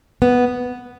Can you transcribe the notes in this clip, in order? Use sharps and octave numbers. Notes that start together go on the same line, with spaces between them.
B3